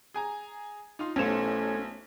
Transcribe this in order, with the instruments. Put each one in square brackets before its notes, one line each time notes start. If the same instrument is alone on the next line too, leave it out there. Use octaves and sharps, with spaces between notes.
[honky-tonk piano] G#4 G#5 A#5
D#4 F4 C6
[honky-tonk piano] B1 C5 E7 [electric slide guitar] A3 C#4